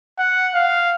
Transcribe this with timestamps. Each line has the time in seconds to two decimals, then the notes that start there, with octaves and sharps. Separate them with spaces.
0.19 F#5
0.54 F5